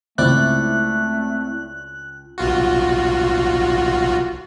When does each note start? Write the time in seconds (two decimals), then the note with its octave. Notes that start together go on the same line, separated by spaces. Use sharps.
0.18 C#2 A3 C4 E4 D5 F#6
2.38 B1 F4 F#4